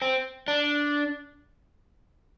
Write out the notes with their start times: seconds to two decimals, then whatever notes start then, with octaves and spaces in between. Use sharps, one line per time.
0.02 C4
0.48 D4